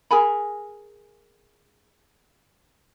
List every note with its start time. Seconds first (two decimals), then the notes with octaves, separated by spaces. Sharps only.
0.11 G#4 A#4 G#5 B5